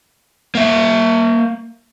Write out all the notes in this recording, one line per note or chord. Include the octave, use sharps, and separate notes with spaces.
A#3 E5